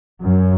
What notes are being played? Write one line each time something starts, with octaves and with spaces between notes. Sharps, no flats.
F#2